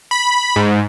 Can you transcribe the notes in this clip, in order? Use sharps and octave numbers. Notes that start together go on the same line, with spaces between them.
B5
G#2